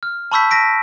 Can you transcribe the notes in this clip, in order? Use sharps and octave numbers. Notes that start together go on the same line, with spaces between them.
F6
A5 B5 C#6 E6 G6 B6
A5 A#6 B6 D7